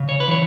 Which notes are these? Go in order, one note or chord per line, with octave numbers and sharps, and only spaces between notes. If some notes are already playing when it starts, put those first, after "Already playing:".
Already playing: C#3
C#5
B4
E3 C#5